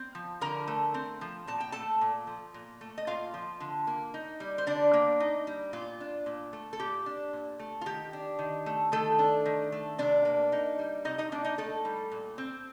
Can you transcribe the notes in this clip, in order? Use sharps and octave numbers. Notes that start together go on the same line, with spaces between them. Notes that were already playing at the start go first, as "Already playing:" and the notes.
Already playing: C4
F3
D3 A#4 A#5
A3
C4
F3
A#2 A5
G5
A3 A4 A5
A#2
F3
A#2
A3
D#5
A#2 F4 F5
F3
D3
A#3
D#4
G3
C5
D3 D4 D5
A#3
D#4
G3
A#2 F4
D4
A#2
A3
A4
A#2 G4
D4
A#2
A3
F4
D#3 G4
D4
D#3
A3
D#3 A3 A4
D4
D#3
A3
C3 D4 D5
A#3
D#4
G3
C3 D#4 D#5
D#4 D#5
A#3 D4 D5
D#4 D#5
A3 D#4 A4
G3
A#2
C4